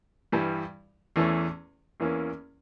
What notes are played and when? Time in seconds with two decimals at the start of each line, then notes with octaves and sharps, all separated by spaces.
0.32 G2 E3 G3
1.16 E2 E3 A3 C#4
2.00 E2 E3 A#3 C#4